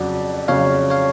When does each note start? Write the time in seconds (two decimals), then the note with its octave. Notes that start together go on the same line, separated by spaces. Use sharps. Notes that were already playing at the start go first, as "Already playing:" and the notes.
Already playing: F2 C#3 F#3 D5 F#5
0.48 F2 C#3 F#3 C#5 F5
0.90 C#5 F5